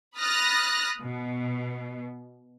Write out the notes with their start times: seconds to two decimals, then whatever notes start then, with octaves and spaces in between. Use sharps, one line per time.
0.18 B5 D#6 F6 F#6 A6 A#6
1.01 B2